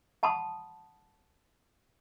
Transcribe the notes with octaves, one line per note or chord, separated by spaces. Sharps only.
F#5 A5 B5 C6 D#6